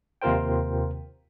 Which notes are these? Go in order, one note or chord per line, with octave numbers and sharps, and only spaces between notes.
D#2 C3 F4 A#4 C5 G5